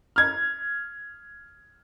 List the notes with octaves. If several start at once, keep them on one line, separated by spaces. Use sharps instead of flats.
F6 G#6